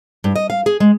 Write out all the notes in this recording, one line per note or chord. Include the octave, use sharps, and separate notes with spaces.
G2
D#5
F5
G#4
G#3